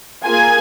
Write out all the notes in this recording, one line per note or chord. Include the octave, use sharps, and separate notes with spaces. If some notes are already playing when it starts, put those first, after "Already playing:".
A#3 F4 G#4 G#5